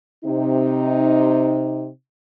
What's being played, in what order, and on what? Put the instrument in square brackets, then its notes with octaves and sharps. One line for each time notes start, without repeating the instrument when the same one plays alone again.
[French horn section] C3 D#4